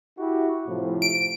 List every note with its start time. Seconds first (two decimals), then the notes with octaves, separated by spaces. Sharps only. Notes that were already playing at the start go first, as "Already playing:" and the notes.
0.17 E4 F#4 G4
0.66 A2 C3 F3
1.02 D7